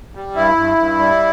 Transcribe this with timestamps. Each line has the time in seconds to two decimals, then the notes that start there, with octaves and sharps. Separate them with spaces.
0.15 G3
0.35 G2 E4
0.56 G2
0.78 G2
0.99 G3